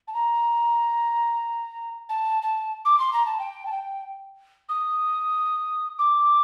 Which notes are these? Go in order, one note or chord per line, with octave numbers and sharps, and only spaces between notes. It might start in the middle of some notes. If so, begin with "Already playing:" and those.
A5
A#5
A5
A5
D6
C6
A#5
A5
G5
A5
G5
D#6
D6